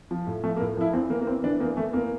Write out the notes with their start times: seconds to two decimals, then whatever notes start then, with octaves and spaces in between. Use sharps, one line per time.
0.11 F3
0.27 A2
0.44 F3 A3
0.56 A#3
0.60 A2
0.77 F3 E4
0.93 E2 C4
1.10 E3 A#3
1.21 A#3
1.27 E2 C4
1.44 E3 D4
1.60 E2 A#3
1.77 E3 A3
1.93 E2 A#3